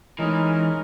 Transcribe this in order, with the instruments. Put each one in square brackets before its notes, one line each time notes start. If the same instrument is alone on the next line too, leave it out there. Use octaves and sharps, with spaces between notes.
[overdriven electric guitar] E3 [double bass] G#3 D#4 [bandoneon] C#4 A#4 [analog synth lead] D#5